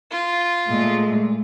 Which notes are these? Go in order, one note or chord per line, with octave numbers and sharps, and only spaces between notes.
F4
A#2 G#3 A3